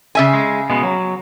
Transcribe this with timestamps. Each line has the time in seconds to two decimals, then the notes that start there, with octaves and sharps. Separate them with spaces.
0.15 C#3 E5 G#5
0.33 G#3
0.70 B2 G#3 B3
0.83 F#3